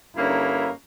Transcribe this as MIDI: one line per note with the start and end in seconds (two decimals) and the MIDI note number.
0.17 0.69 43
0.17 0.69 50
0.17 0.69 58
0.17 0.69 61
0.17 0.69 63
0.17 0.69 64